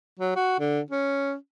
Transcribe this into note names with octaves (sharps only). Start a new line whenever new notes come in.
F#3
F#4
D3
C#4